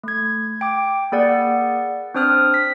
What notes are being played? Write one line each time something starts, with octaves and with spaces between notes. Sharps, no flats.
A3 G#6
G5 D6
A#3 G#4 D5 F#5
C4 D4 C5 D#6 F6 F#6
B6